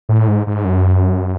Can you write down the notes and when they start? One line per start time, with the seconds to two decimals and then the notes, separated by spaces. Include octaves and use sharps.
0.09 A2
0.28 G#2
0.47 G#2
0.65 F#2